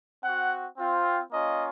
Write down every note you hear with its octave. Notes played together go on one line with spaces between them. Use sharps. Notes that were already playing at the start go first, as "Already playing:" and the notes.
C4 F#4 F#5
C4 F4
A#3 C#4 F4 D#5